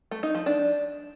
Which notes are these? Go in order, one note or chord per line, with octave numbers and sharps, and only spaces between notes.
A3
D#4
F3
D4